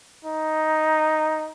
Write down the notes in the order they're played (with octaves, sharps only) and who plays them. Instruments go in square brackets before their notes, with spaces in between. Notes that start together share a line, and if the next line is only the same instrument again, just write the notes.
[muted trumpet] D#4